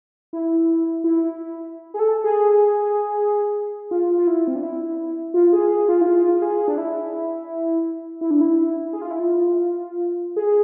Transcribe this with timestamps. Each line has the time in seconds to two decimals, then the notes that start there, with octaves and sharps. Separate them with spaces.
0.33 E4
1.04 E4
1.94 G#4
1.99 A4
2.24 G#4
3.91 F4
4.18 F4
4.27 E4
4.48 C4
4.55 D4
4.63 E4
5.34 F4
5.53 G#4
5.71 G#4
5.89 F4
6.01 E4
6.07 F4
6.33 F4
6.42 G#4
6.68 D4
6.78 E4
8.21 E4
8.31 D4
8.41 E4
8.93 G#4
9.02 F4
9.11 E4
9.19 F4
10.36 G#4